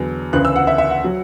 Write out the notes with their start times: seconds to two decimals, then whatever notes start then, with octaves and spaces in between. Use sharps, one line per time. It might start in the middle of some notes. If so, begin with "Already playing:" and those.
Already playing: E2 D3 F#3
0.33 D2 C#3 E3 F#6
0.45 E6
0.56 F#5
0.67 E5
0.78 E5
0.90 F#5
1.04 F#3